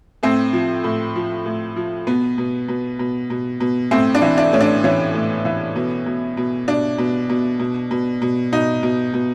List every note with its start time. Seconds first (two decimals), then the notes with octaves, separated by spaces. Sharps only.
0.23 A2 C4
0.53 F3
0.84 A2
1.16 F3
1.46 A2
1.76 F3
2.07 B2 B3
2.38 B2
2.68 B2
2.99 B2
3.30 B2
3.60 B2
3.91 A2 C4
4.15 D4
4.22 E3
4.38 D4
4.53 A2 C#4
4.60 D4
4.84 E3 C#4
5.14 A2
5.45 E3
5.76 B2
6.06 B2
6.37 B2
6.68 B2 D4
6.98 B2
7.29 B2
7.59 B2
7.91 B2
8.22 B2
8.52 B2 D#4
8.83 B2
9.13 B2